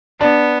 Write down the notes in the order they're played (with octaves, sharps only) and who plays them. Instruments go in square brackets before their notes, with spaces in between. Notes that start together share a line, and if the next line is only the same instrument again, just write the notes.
[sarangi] B3 [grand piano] D4